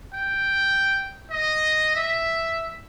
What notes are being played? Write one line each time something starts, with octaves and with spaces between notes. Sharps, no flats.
G5
D#5
E5